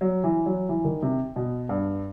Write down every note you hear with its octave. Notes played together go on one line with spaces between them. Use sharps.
F#3
E3
F#3
E3
D#3
C3
B2
G2